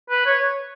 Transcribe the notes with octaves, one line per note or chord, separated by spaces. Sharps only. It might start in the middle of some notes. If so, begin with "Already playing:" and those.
B4
C#5